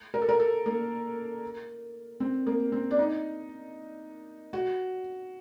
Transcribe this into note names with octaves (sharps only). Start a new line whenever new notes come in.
A#4
A4
A#4
A4
A#3
C4
A#3
C4
D4
D#4
F#4